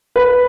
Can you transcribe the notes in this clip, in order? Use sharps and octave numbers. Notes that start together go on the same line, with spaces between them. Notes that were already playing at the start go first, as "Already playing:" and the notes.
B4